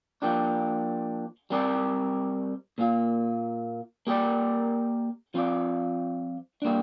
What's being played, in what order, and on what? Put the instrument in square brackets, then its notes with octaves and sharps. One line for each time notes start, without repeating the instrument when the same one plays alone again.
[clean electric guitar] F3 A#3 D4 G4
G3 C4 A#4 D5
A#2 A#3 F4
A#3 G4 A#4 D5
F3 C4 F4 D5
G3 A#3 D4